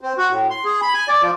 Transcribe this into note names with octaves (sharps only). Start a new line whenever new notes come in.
C4
F#4
A2
C6
G#4
B5
G#5
D5
F3